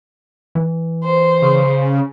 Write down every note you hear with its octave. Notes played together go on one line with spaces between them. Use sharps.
E3
C5
C#3